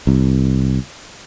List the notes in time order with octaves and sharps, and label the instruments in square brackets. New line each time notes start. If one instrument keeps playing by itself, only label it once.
[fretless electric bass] C2